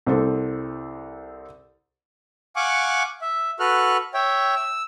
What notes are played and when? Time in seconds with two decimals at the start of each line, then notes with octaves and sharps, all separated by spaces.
0.06 C2 C4 A4
2.56 F5 F#5 G#5 C#6 D6 F#6
3.22 E5
3.60 F#4 A4 B4 F6 F#6
4.14 C#5 E5 G5
4.56 E6